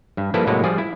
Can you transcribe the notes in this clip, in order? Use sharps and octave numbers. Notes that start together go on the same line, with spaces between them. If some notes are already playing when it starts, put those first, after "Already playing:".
G2
F3 G3 A#3 E4 A4 B4
A2 C3 F#3 G#3 A#3
F3 G3 F4 G#4 D5
E4